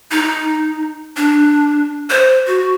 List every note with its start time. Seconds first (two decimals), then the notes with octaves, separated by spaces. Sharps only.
0.11 D#4
1.17 D4
2.10 C5
2.47 F#4